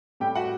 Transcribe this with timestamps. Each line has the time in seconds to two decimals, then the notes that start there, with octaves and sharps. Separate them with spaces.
0.20 A2 G3 G4 G5
0.35 F#4 F#5